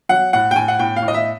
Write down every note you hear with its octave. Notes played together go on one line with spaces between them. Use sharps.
F#3 F#5
A2 F#5
G5
A2 G#5
F#5
A2 G5
F5
A2
D#5
E5